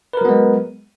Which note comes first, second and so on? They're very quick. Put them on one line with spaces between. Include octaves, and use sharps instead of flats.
B4 A#4 F#3 B3 G#3